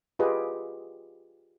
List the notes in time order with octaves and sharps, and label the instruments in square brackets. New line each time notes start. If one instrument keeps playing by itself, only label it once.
[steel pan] F4 G4 G#4 B4 D#5